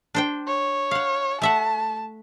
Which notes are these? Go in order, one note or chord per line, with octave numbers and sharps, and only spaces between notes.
D4 C5 G5
C#5
F5 F#5
A3 E5 F#5 A5